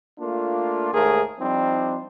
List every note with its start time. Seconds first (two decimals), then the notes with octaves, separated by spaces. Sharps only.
0.19 A3 A#3 D4 F4
0.93 D#2 G#2 A3 G#4 A#4
1.40 F3 G3 C4 D4 D#4